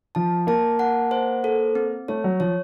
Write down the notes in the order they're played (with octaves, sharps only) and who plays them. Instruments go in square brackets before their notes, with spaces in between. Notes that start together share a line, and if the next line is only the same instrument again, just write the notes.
[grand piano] F3 [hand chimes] A5
[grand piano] A#3 [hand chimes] A5
[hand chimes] F#5
C5
A4
C4
[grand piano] A3 [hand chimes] C#5
[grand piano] F#3
[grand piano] F3 [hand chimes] C#5